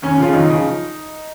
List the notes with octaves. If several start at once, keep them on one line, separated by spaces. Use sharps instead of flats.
D#2 C#4
C#3 F3 F4
D#2 D#4
C#3 F3